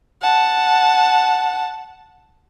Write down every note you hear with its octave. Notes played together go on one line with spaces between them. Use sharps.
F#5 A5